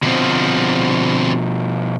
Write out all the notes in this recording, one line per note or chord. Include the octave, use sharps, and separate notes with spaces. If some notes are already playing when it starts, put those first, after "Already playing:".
B2 D3 D#3 F3 C4